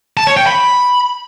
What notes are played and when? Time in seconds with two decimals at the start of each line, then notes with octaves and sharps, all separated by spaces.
0.17 A5
0.27 C#5
0.37 G5
0.47 B5